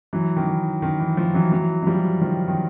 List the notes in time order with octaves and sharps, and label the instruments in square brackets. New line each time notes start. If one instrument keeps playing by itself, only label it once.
[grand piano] E3 F#3
D#3
E3
D#3
E3
D#3 F3
E3 F#3
E3 F#3
F#3
F3 G3
D#3 F3
D#3